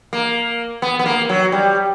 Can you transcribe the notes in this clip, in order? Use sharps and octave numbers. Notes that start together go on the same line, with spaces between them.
A#3
B3
B3
A#3
F#3
G3